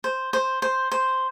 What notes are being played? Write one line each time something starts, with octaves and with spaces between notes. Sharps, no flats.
C5
C5
C5
C5